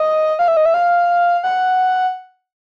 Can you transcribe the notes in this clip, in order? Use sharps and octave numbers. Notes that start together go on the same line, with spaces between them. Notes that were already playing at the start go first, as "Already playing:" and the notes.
Already playing: D#5
F5
E5
D#5
E5
F5
F#5